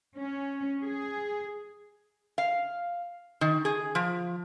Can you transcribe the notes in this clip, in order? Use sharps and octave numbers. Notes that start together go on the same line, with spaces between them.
C#4
G#4
F5
D#3
G#4
F3